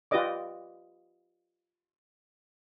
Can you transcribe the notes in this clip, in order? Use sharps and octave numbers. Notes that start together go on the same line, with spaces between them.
F4 G4 B4 D5 D#5 D6